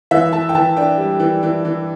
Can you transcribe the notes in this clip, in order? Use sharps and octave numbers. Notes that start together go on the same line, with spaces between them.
E3 E5
E3 A5
G5
E3 A5
D4 G5
G3
E3
E3
E3